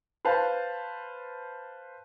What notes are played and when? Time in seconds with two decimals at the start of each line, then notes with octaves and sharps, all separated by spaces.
0.25 B4 C5 F5 A5